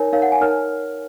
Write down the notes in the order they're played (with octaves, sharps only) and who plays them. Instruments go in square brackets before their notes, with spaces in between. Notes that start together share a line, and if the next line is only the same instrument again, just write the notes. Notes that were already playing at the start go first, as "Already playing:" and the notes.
Already playing: [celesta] D#4 A#4 C#5 G#5
D#4 A#4 C#5 F5
F#5
G#5
D#4 A#4 C#5 F6